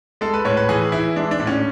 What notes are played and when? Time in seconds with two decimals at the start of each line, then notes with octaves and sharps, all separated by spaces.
0.21 G#3 A4
0.34 B4
0.45 A2 C#5
0.57 B4
0.69 E3 G#4
0.92 E3 E4
1.16 G#3 D4
1.31 D4
1.40 A2
1.47 C#4